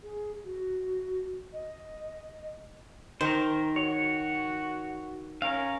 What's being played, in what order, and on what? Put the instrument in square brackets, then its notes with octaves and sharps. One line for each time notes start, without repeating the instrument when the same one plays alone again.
[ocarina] G#4
F#4
D#5
[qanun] D#3 [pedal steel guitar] A#4 C5
[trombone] F#4 [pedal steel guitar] C#5
[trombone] C#4 [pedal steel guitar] A#4 F5